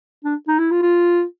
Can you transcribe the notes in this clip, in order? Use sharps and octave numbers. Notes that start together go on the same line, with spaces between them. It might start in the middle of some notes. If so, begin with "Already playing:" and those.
D4
D#4
E4
F4
F4